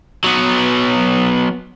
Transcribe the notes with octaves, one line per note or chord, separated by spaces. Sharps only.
F#3 B3